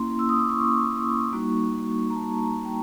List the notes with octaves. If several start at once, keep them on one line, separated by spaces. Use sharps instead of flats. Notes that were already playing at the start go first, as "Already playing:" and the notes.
Already playing: A#3 C#4 E4 C6
E6
D#6
D6
C#6
G3 A#3 D#4 F#4
A#5
A5
A#5
G5